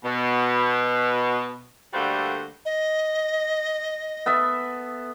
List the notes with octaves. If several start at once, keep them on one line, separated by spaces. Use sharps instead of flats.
B2
D3 G3 A3 A#3 F#4 C5
D#5
B3 A4 E5